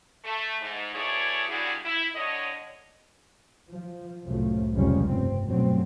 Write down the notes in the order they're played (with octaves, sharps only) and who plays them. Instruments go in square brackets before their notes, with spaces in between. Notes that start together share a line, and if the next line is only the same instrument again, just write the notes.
[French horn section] A3
G#2
B2 A3 E4 G#4 C#5 D5
A#2 D3 G3 E4 F#4 G#4
E4
A2 D3 C#5 D#5
[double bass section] F3
C2 F#2 A2 F3 A3
F1 C#2 C3 F3 G3 C#4
G2 C4
G2 B2 F3 F#3 A3 C4